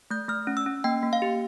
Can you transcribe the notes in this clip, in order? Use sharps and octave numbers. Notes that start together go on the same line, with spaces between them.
A3 G6
A3 F6
C#4
E6
C#4
A#3 G5
A#3
F5
G4